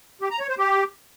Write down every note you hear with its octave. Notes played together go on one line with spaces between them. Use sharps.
G4
A#5
C#5
C5
G4